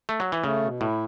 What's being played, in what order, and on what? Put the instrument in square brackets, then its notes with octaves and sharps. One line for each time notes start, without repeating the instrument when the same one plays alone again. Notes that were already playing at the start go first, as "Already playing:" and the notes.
[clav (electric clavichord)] A3
F#3
E3
[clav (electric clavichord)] C#3 [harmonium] A3
[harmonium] B2
[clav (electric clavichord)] A2 [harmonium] E4